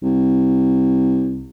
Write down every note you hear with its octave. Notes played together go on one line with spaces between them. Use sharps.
C2